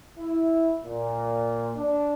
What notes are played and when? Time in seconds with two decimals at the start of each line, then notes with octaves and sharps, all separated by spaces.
0.18 E4
0.85 A#2
1.76 D4